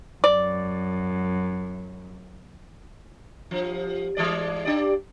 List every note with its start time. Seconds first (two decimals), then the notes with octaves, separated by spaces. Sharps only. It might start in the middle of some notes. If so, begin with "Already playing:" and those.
0.24 F#2 D5
3.51 G2 F3
4.17 E3 G#3 D5
4.65 D4 G4 D5